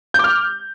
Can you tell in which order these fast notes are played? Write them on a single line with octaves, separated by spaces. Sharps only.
G6 D6 F6